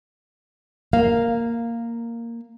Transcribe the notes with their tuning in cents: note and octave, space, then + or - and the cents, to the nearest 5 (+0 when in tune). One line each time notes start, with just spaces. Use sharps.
A#3 -5 F5 +0